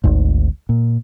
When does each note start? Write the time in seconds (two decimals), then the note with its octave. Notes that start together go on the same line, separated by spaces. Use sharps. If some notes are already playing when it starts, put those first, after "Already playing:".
0.04 G#1 D2 G#2
0.69 A#2